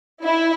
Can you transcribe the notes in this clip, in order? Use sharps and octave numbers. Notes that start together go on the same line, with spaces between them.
E4